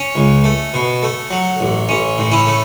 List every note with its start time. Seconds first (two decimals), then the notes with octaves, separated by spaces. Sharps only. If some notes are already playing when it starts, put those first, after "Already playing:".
Already playing: C#4
0.15 C#2
0.44 A3
0.74 B2
1.03 A3
1.30 F#3
1.60 A1
1.89 A1 C#4
2.18 A2
2.32 C#4 E4
2.47 A3